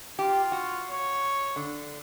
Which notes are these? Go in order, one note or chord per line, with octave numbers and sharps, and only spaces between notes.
F4 G4
F#4
C#5
D3